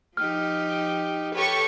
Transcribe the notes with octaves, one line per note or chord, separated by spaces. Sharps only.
F3 D#4 G4 F6
G4 A4 B4 C#5 C#6